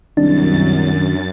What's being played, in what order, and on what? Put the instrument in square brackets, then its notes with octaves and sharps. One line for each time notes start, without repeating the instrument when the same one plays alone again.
[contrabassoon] C2 [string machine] F#2 A6 [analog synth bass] D#3 [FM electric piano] D4